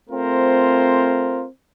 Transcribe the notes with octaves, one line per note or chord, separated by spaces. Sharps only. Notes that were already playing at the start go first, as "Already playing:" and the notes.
A3 C4 F4 A#4 C5